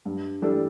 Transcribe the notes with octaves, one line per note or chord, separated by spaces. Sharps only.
G2
E3 G3 D4 A4